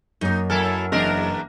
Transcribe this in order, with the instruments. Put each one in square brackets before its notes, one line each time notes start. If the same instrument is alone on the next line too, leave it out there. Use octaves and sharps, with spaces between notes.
[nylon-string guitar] F#2 A#3 [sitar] D#4
[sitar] F#3 E4 A4 [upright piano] A#4 G#5 F6
[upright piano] F#1 D#5 A#6 [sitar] E2 D4 A#4